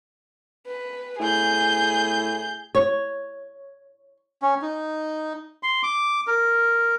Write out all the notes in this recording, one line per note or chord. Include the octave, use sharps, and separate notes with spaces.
B4
A2 G#4 G6
C#5
C#4
D#4
C6
D6
A#4